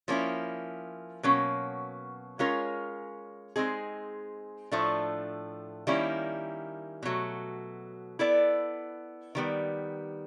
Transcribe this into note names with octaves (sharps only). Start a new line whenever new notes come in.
F3 A#3 C#4 E4
B2 F#3 A#3 C#4
G#3 C#4 F4 A#4 C#5
G#3 C4 D#4 G#4
A2 F3 A3 D4
D#3 G3 A#3 C#4 E4
B2 F#3 A3
B3 E4 A4 D5
D#3 G3 B3